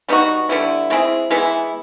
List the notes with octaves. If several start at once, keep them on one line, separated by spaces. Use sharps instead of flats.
G3 B3 D#4 F#4
D3 G3 B3 E4
G#3 C4 E4 G#4
E3 G#3 B3 E4